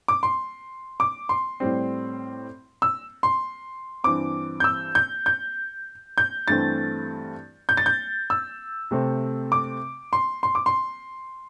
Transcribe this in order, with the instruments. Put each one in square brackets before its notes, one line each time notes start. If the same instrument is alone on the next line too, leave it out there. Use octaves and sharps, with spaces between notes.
[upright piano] D6
C6
D6
C6
A2 G3 C4
E6
C6
G2 E3 C4 D6
G6
E6
G6
G6
G6
G2 E3 A3 C4 A6
G6
A6
G6
E6
C3 A3 C4
D6
C6
C6
D6
C6